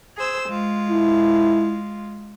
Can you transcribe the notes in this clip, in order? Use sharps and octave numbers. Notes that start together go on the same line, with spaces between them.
G#4 C5 E6
G#3 F4
E4